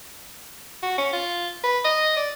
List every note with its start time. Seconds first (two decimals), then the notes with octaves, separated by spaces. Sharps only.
0.83 F#4
0.98 C#4
1.13 F4
1.64 B4
1.84 D#5
2.17 D5